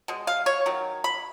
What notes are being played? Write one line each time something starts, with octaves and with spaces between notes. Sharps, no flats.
B2 G#3
F5
C#5
D#3 F#3
B5